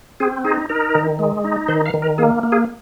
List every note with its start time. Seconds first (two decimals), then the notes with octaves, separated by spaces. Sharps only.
0.20 C4 G#4
0.44 D#4 G#4
0.70 D#4 A#4
0.95 D#3
1.19 G#3
1.44 D#4
1.68 D#3 C5
1.86 F5
1.94 D#3
2.02 A#4
2.18 A#3 G#4
2.43 A#3
2.52 G#4